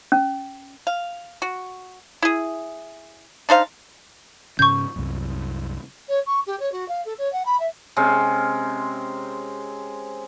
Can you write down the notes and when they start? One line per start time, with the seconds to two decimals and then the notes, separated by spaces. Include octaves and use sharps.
0.12 C#4
0.87 F5
1.42 F#4
2.22 E4 G#4
3.49 D4 D#4 C5 F5
4.59 G#2 C#3 C#4 C#6 G6
4.96 C2 F#2
6.08 C#5
6.26 C#6
6.46 G4
6.59 C#5
6.71 F#4
6.88 F5
7.05 A4
7.18 C#5
7.32 F#5
7.45 B5
7.59 E5
7.96 C3 G#3 C#4